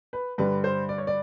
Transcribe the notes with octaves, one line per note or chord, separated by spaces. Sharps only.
B4
G2 D3 G3 B4
C5
D5
C#5
D5